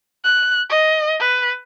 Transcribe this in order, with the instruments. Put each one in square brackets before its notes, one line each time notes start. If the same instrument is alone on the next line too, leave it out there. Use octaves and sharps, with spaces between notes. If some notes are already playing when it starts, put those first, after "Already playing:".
[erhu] F#6
D#5
B4